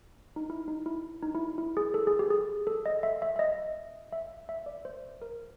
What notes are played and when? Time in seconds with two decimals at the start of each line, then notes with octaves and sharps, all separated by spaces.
0.36 D#4
0.50 E4
0.68 D#4
0.86 E4
1.23 D#4
1.35 E4
1.58 E4
1.77 G#4
1.94 A4
2.07 G#4
2.19 G4
2.30 G#4
2.67 A4
2.86 D#5
3.03 E5
3.22 E5
3.36 E5
3.39 D#5
4.12 E5
4.49 E5
4.66 D5
4.85 C5
5.22 A#4